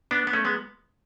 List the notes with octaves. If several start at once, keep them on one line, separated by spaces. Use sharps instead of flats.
B3 D4
B3
A3 C#4
G#3 B3